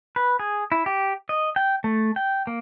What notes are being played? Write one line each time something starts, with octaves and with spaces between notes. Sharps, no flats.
B4
G#4
E4
G4
D#5
G5
A3
G5
A#3